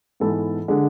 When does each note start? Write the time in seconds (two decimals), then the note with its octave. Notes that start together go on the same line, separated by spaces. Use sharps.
0.20 G#2 E3 B3 E4 A4
0.68 D3 G#3